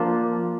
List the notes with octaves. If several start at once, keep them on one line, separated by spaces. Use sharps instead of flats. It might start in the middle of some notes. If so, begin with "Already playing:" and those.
Already playing: F3 A#3 D4 F4